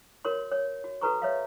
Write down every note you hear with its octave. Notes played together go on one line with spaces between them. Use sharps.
F#4 A#4 C#5 C6
C#5
F#4
F#4 A4 B4 A#5 C#6
C#5 E5 F5